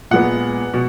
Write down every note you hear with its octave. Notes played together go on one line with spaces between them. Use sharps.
A#2 G#3 B3 F#5
B2